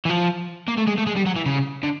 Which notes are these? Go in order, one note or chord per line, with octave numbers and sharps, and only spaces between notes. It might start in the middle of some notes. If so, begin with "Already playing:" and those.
E3
F3
A#3
A3
G#3
A3
G#3
G3
F#3
E3
C#3
D3